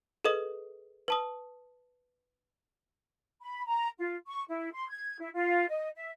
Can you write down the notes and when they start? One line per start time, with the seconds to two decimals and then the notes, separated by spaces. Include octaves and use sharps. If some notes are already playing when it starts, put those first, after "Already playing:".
0.24 G#4 A4 B4 D#5 D#6
1.08 B4 A5 D#6
3.41 B5
3.65 A#5
3.98 F4
4.26 C#6
4.48 E4
4.72 C6
4.88 G#6
5.19 E4
5.34 F4
5.69 D#5
5.95 E5